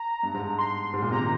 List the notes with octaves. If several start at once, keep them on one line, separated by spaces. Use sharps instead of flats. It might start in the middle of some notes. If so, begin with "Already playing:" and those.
Already playing: A#5
G2
G#2
C6
G#2
A#2
C3 A#5
D#3